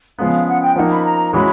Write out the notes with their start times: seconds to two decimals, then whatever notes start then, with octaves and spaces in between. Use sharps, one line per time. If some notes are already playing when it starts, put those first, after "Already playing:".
0.19 C#3 F3 G#3 B3 F5
0.48 F#5
0.62 G5
0.76 F3 A#3 D#4 F#5
0.91 B5
1.05 A#5
1.33 E3 G#3 C#4 F#4 B5